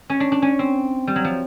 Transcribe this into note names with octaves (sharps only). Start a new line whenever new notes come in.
C#4
D4
D4
C#4
C4
G3
F#3
F3